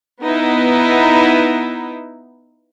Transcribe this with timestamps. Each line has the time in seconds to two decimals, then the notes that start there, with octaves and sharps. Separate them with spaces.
0.21 B3 D#4 E4